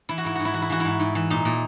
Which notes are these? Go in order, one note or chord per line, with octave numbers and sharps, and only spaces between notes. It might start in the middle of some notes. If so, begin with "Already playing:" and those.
E3 E4
F#4
G#2 E4
G#2 F#4
E4
E3 F#4
E4
E3 F#4
G#2 E4
G#2
E3
A#2 D#4
A#2